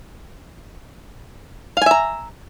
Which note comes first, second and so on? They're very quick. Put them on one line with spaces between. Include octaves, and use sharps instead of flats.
F5 G#5 E5 A#5